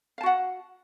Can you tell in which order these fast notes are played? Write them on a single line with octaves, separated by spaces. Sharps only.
F5 A5 F#4 F#5